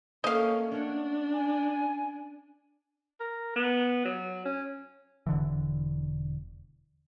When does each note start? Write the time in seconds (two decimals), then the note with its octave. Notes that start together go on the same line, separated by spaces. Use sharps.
0.24 A3 A#3 C#4 D#5 F5
0.72 C#4 D4 C#5 F#5
1.33 G#5
3.20 A#4
3.56 B3
4.05 F#3
4.45 C#4
5.26 E1 D3 E3